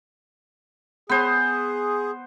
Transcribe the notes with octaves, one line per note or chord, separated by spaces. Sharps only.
B3 G#4 C5